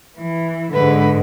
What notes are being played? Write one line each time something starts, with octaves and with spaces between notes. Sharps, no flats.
E3
G#2 D3 G#3 B4